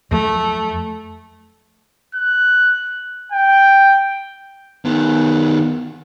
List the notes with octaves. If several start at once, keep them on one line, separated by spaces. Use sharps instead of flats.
F2 F3 F#3 A3
F#6
G5
D#3 B3